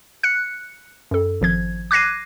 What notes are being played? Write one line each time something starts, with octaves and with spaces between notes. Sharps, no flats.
F#6 C#7
F#2 A4
G#1 F3 G#6
D6 F#6 G#6 A#6 C7 D#7